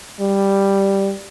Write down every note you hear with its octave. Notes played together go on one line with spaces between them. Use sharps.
G3